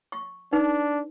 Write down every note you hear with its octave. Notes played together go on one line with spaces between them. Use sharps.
C#6
D4 D#4 B4